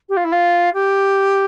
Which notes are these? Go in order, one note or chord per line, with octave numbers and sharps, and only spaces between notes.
G4
F4
E4
F4
G4